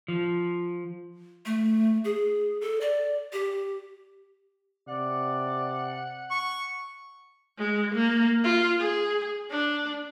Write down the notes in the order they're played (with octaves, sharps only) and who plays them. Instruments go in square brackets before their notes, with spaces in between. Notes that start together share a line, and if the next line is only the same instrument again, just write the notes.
[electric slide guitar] F3
[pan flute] A3
G#4
A4
D5
G4
[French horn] C3 [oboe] D5 [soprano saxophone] F#5
[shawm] C#6
[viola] G#3
A#3
F4
G#4
D4